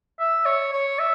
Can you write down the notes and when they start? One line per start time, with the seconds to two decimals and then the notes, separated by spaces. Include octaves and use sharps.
0.20 E5
0.45 C#5
0.73 C#5
0.99 E5